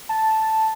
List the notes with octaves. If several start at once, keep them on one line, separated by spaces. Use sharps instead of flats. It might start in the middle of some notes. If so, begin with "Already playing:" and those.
A5